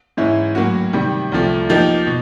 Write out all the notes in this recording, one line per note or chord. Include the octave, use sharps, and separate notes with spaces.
G#2 E3 G#3 C#4 E4
A2 F#3 A#3 C#4 F#4
C3 D#3 G3
C2 C3 F3 A3
F3 A#3 D#4 G4
B2